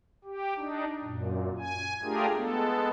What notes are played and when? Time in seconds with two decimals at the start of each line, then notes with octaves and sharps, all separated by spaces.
0.24 G4
0.57 D4 D#4
1.03 F#2 A#2
1.58 G#5
2.03 A3 D4 F4 G4 G#4 A#4
2.35 G#3 B3 A4